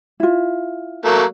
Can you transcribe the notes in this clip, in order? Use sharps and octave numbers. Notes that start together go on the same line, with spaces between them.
E4 F4
F#3 A3 A#3